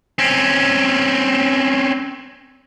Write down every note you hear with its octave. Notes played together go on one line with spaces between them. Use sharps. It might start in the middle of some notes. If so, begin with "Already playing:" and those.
C4 C#4